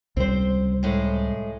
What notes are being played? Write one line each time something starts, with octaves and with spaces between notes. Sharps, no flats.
C#2 C3 G3 C4 C5
A2 G#3 A3